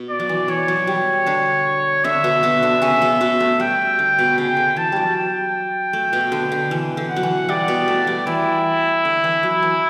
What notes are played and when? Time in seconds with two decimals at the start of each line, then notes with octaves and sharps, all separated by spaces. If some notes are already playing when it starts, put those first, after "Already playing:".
Already playing: B2
0.10 D5
0.20 F#3
0.29 E3
0.48 E3 C#5
0.68 F#3
0.87 G3
1.26 D3 D4
2.04 D3 D4 E5
2.24 B2 B3
2.43 B2 B3
2.63 D3 D4
2.82 C#3 C#4
3.02 B2 B3
3.21 B2 B3
3.40 A3
3.60 G3 G5
3.99 D3
4.19 B2
4.38 C#3 G5
4.57 D3
4.76 E3 A5
4.92 F#3 G3
5.16 G5
5.93 A3
6.13 B2 B3
6.32 D3
6.52 D3
6.71 E3
6.97 D3
7.11 F#5
7.16 F#3
7.23 E3
7.49 G3 D5
7.68 B2 B3
7.88 A3
8.07 G3
8.27 E3 E4
9.05 D3
9.24 E3
9.43 F#3
9.63 E3